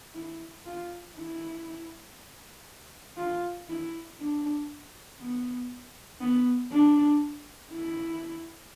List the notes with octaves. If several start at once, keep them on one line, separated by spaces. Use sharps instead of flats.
E4
F4
E4
F4
E4
D4
B3
B3
D4
E4